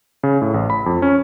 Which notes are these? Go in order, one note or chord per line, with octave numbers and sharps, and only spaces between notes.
C#3
A2
A1
B5
F2
C#4